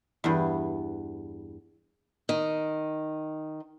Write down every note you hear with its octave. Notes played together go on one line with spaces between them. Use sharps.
E2 G2
D#3